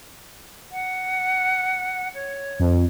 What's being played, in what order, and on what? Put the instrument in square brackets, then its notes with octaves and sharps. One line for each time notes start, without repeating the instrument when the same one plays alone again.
[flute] F#5
C#5
[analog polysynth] F2